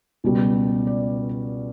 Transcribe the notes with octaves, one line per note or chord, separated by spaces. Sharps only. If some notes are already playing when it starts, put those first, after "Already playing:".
C#2 B2 G3
D5